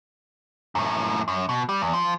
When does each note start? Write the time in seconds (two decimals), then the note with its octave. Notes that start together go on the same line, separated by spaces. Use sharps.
0.75 F#2 A2
1.28 F#2
1.49 B2
1.69 G3
1.82 E2
1.94 F3